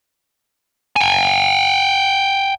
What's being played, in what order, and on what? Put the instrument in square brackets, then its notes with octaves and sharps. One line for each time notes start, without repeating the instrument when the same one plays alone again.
[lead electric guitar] G5 G#5